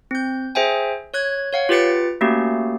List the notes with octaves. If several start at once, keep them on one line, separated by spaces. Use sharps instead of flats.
C4 G6
G#4 C5 E5 G5 G#5
C#5 F#6 G#6
C#5 F5 F#5
F4 G4 B4 A6 C#7 D7
A3 A#3 C#4 F#4 G4